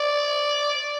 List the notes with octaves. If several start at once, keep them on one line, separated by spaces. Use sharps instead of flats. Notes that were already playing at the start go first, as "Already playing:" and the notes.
Already playing: D5